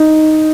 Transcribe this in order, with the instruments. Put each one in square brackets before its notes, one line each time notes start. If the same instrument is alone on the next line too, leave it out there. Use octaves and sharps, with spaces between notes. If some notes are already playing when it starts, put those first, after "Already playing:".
Already playing: [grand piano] D#4